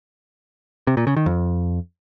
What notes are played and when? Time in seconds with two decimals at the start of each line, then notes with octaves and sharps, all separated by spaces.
0.87 C3
0.97 A#2
1.07 C#3
1.16 D#3
1.26 F2